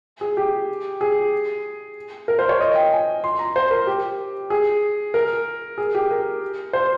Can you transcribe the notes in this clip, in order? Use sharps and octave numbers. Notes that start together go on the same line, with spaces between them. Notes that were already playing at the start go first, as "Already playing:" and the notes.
G#4
G4
G#4
A#4
C5
C#5
D#5
G5
G#5
C6
A#5
C5
A#4
G4
G#4
A#4
G#4
G4
A#4
C5